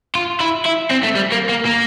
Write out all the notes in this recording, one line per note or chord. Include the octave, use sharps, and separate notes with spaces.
F4
E4
E4
C4
A3
G3
A#3
A#3
A#3